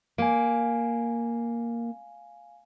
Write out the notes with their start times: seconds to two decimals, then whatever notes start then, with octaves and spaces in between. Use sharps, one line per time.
0.18 A#3 F5 G#5